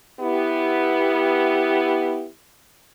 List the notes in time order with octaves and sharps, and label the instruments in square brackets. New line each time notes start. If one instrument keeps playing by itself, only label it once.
[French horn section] B3 E4 G4